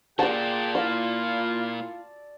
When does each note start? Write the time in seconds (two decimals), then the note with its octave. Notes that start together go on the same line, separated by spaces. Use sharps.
0.19 A#2 A#3 G#4 D5 F#5 G5 A5
0.75 E4 F4 E6